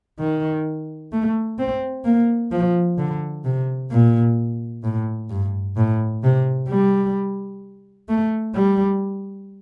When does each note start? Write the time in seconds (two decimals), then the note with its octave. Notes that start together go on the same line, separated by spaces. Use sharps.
0.19 D#3
1.12 A3
1.59 C4
2.05 A#3
2.51 F3
2.98 D3
3.44 C3
3.91 A#2
4.83 A2
5.30 G2
5.77 A2
6.23 C3
6.69 G3
8.09 A3
8.55 G3